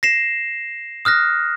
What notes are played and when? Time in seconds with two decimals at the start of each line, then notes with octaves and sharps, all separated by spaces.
0.03 A#6 C7 E7
1.05 D#6 F6 F#6 A#6